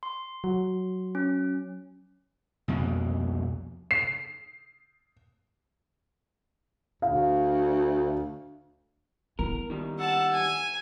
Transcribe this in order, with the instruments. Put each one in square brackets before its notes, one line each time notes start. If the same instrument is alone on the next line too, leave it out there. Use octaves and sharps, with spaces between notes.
[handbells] C6
[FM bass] F#3
[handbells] C#4
[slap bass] C2 F2 B2 A#3
[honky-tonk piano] C7
[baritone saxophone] D2 [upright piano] F5
[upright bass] B3 E4 [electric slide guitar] A#4
[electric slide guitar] D#3 G3
[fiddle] F#5 A5 [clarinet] E6
[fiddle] G#5